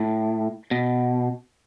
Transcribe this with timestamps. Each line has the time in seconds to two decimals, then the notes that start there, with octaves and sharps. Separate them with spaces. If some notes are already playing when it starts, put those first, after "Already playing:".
Already playing: A2
0.71 B2